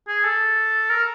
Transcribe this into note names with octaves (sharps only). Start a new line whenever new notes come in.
G#4
A4
A#4